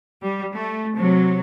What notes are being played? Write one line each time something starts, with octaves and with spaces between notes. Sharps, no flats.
G3
A3
C3 F#3